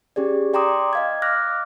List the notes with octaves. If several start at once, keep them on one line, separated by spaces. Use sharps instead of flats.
C#4 G4 G#4 D5
D5 G5 A#5 C6 D6 D#6
D#5 F5 G#6
D6 F6 F#6 A#6